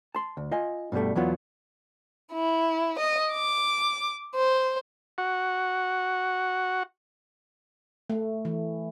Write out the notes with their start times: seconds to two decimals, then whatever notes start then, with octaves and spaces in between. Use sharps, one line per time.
0.15 A5 C6
0.37 D2
0.51 F4 D#5 G#5
0.92 G2 B2 F3 G3 A3
1.15 E2 F#3 B3 F4 F#4
2.33 E4
2.99 D#5
3.32 D6
4.35 C5
5.18 F#4 F#5
8.10 A3
8.45 E3